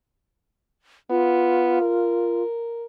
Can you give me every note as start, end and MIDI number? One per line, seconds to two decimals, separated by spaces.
1.10 1.79 59
1.10 2.43 65
1.81 2.86 70